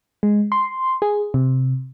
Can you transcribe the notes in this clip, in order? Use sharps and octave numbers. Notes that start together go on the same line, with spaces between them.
G#3
C6
G#4
C3